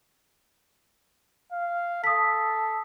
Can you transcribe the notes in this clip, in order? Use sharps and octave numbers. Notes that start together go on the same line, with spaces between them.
F5
A4 D#6 B6